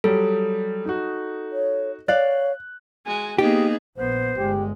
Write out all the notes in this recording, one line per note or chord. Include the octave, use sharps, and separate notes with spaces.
F#3 G3 A4
D#4 F#4
C#5
C#5 D5 F5 F#6
G#3 F#4 G#5
A#3 B3 D#4 G4 G#4
A#1 B3 C5
G1 G#3 G4